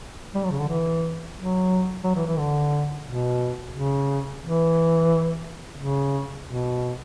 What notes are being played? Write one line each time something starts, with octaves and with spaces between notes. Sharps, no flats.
G3
F#3
C#3
D3
E3
F#3
F#3
E3
E3
D3
B2
C#3
E3
C#3
B2